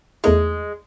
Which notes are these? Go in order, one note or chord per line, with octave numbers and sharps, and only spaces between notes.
E2 G#3 A3 D#4